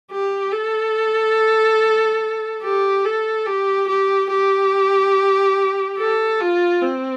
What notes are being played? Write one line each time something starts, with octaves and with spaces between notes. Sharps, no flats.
G4
A4
G4
A4
G4
G4
G4
A4
F4
C4